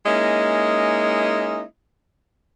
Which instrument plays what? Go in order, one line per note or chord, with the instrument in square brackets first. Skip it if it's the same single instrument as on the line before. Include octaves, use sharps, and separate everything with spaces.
[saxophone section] G#3 A#3 C#4 D#4 E4 D#5